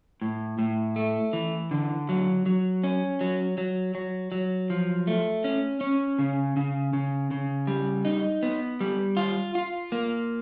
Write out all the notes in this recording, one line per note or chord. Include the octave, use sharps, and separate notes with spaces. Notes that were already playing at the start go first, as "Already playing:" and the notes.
A2
A2
A3
E3
D3
F#3
F#3
C#4
F#3
F#3
F#3
F#3
F3
A3
C#4
C#4
C#3
C#3
C#3
C#3
G3
D#4
B3
G3
F4
F4
A#3